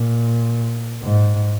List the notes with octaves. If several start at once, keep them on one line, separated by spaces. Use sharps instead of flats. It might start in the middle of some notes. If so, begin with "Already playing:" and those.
Already playing: A#2
G#2